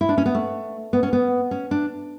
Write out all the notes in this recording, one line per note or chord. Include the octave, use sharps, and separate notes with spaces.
E4
D4
C#4
B3
A3
B3
C#4
B3
C#4
D4